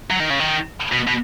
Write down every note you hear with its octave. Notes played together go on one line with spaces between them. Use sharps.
F#3
D#3
C#3
D#3
B2
B2